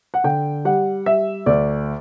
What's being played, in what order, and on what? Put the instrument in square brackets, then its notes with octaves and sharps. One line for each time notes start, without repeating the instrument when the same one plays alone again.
[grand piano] F#5
D3 G5
G3 F#5
G3 E5
D2 D5